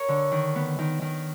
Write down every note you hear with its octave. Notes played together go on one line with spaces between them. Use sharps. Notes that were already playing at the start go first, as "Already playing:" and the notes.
Already playing: A#4 C#5
D3
D#3
B3
D#3
D#3